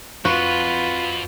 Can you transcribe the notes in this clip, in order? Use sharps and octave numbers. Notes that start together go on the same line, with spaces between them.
F2 F4 F#4 B4